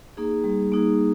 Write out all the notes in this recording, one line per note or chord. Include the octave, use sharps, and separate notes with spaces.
A#3 D#4 G#4
G3
A#3 D#4 G#4